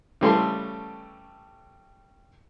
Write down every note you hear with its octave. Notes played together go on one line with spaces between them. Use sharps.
C#3 E3 G3 A3 A4 C6